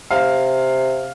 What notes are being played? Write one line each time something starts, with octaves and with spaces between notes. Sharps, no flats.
C3 F5